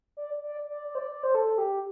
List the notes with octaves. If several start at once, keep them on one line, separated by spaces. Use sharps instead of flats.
D5
D5
D5
D5
C5
D5
D5
C5
A4
G4